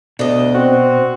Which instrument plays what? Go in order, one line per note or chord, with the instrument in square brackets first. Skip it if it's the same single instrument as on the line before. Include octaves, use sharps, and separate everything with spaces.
[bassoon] D2 [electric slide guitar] B2 [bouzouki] D4 D#5
[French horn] C4 [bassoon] F#4